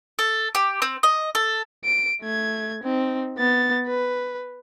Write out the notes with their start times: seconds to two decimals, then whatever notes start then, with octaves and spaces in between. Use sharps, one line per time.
0.19 A4
0.55 G4
0.82 C4
1.03 D#5
1.35 A4
1.85 D7
2.22 A3 G#6
2.83 C4 D#4
3.38 B3 A6
3.87 B4